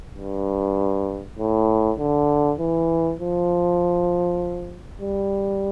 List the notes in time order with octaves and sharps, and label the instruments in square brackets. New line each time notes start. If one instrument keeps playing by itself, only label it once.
[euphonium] G2
A2
D3
E3
F3
G3